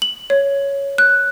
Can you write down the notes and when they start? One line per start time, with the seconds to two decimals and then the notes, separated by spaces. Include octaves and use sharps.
0.02 F#7
0.30 C#5
0.98 F#6